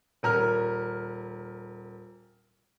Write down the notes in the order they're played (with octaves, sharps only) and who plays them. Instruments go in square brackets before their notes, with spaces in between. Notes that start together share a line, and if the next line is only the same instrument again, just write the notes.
[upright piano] D#1 A#4 F6